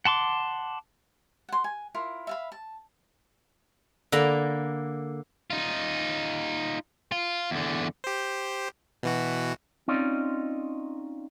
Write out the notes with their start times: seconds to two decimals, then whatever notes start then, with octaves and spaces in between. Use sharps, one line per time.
0.05 F#5 A5 C6 D6
1.49 F#5 C6
1.64 G#5
1.94 E4 F4 A#4
2.27 E5 F5 B5
2.52 A5
4.12 D3 A#3 D5 A#5 B5
5.50 D#4 F4
7.12 F4
7.51 E2 D3
8.04 G4 C5
9.03 B2 E3 F#4
9.88 C4 C#4 D#4 F4 D5 D#5